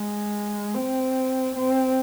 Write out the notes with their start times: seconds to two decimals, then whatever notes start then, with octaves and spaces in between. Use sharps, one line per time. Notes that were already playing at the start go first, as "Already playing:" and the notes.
Already playing: G#3
0.74 C4
1.55 C4